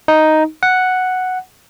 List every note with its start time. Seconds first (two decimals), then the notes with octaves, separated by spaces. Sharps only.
0.08 D#4
0.63 F#5